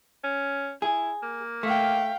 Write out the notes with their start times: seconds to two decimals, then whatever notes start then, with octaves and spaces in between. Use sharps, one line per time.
0.24 C#4
0.82 E4 G#4
1.22 A#3
1.63 A3 F5 G5